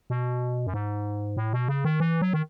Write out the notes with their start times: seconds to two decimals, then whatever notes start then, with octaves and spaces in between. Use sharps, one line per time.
0.10 B2
0.67 F#2
0.74 G#2
1.37 A2
1.53 B2
1.68 C#3
1.85 D#3
2.00 E3
2.22 F#3
2.33 D#3